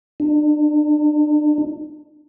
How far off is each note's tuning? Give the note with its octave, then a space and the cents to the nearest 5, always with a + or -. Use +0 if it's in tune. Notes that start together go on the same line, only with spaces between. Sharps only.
D4 +35